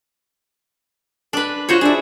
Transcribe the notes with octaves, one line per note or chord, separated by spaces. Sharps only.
D4 B4
F4 F#4 C5 C#5
D4 E4 G#4